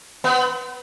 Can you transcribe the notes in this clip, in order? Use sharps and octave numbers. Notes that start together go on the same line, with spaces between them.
B3